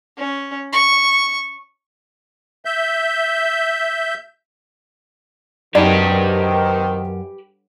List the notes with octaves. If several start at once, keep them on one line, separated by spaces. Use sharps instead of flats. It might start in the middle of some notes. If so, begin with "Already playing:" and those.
C#4
C#6
E5 G6
F#2 C3 D#3 D#4 G4 B4 D5